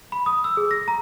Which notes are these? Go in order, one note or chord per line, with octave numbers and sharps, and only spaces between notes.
B5
D#6
E6
G#4
A#6
A#5